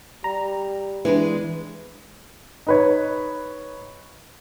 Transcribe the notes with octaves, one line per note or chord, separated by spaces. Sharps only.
G3 A#5
E3 G#3 D4 B4
D#4 B4 C#5